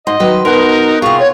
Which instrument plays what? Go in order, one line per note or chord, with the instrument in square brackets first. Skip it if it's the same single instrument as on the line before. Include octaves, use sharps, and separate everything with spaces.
[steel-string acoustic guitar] G#2 [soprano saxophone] D#5 [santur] C6
[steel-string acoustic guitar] D#3 F#3 B4
[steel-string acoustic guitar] B2 [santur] B3 F#5 C6 [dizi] D#4 [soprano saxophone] A#4
[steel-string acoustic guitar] C3 G#4 [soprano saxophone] F4 [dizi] C#6
[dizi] C#5